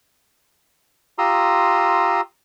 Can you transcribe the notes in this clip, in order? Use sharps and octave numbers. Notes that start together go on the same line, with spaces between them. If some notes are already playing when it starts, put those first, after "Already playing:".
F4 G4 A#5 C6 D#6 E6